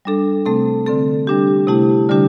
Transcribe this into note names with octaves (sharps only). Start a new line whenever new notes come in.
G3 D4 A4
C3 A3 C4 A4
D3 C4 A4
G3 D4 G4
C3 A3 E4 G4
D3 G3 D4 G4